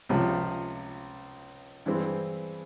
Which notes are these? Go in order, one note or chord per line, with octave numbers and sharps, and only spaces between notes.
C#2 C3 F3
G2 E3 G#3 C4